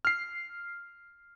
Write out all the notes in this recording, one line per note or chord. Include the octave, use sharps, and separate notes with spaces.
F6 C7